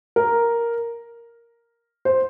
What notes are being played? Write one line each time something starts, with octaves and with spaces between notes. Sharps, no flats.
A#4
C5